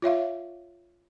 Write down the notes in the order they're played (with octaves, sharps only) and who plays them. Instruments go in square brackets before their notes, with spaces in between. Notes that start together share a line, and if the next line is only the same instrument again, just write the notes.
[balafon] F4 C#5 E5 F5